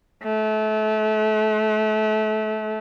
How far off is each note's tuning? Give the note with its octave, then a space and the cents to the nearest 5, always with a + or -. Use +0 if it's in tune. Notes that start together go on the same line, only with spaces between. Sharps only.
A3 -30